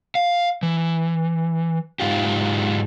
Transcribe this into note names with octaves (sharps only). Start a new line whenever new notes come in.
F5
E3
G#2 F4 G4